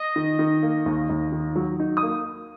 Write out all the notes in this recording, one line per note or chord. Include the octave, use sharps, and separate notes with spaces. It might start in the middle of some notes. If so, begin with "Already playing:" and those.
Already playing: D#5
D#3
D#3
A#3
D#2
D#2
D#3
F#3
D#4
D#6
A#3